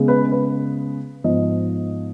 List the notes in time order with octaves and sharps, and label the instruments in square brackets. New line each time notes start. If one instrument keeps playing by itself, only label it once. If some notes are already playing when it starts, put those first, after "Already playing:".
Already playing: [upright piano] C#3 G#3 B3
B4
B4
G#2 F3 B3 D#5